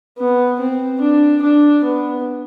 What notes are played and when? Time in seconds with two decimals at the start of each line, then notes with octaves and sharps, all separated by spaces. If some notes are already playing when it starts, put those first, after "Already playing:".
0.18 B3
0.59 C4
1.01 D4
1.42 D4
1.84 B3